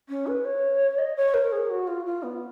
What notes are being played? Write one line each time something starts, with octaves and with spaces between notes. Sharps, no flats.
C#4
B4
C#5
D#5
C#5
A#4
G#4
F#4
F4
F4
B3